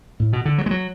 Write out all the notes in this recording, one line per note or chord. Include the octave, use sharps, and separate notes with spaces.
A2
B2
D3
F#3
G#3
F#3